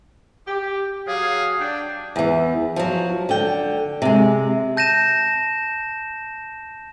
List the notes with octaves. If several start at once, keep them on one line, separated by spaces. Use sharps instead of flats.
G4
F#3 G#4 F5
D4 G5
E2 E3
F3 F#3
D3 G5
C3 G#3
A5 G6 A#6 D#7 E7